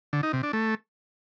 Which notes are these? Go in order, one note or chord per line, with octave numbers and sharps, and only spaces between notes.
D3
D#4
C3
D4
A3